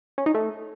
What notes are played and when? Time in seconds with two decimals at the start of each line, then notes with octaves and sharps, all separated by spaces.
0.18 C#4
0.26 D#4
0.34 A3